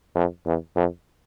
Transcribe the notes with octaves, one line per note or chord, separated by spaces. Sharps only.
F2
E2
F2